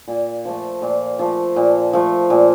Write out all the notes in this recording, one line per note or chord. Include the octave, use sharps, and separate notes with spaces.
A#2
F3 A3
A#2
F3 A3
A#2
F3 A3
A#2